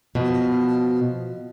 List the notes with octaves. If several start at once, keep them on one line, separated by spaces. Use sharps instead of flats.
B2 F3